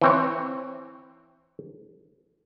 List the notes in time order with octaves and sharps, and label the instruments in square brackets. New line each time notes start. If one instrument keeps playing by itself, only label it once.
[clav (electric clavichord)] E3 C4 C#5